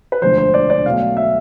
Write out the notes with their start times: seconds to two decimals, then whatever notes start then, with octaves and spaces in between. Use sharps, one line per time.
0.12 B4
0.22 E1 D2 D3 F3 C5
0.38 C5
0.54 D5
0.70 D5
0.85 B1 B2 A3 F5
1.17 E5